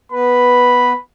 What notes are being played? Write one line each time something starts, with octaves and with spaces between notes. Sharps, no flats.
B3 B4 B5